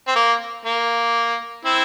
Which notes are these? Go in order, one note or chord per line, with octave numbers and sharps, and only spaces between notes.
C4
A#3
A#3
C4 E4